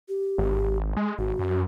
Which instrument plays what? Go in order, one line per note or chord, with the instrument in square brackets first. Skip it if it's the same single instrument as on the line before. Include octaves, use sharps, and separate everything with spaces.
[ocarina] G4
[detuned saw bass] G#1
G#3
[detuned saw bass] G#1 [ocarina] F#4
[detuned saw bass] F#2